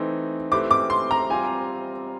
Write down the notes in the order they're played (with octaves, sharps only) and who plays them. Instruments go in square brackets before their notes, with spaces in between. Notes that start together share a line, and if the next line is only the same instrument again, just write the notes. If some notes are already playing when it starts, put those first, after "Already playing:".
Already playing: [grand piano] E3 A3 C4 D#4
[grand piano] A3 C4 E4 G4 B4 [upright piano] D6
[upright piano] D6
C6
A#5
[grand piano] G3 C4 F4 [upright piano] G#5